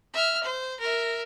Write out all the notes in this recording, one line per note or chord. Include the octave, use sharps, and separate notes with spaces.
E5 F6
C5
A#4 E5